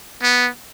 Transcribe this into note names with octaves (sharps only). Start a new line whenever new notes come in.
B3